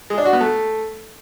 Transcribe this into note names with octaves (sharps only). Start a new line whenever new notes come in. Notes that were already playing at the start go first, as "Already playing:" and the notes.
G#3
D4
F#4
B3
A3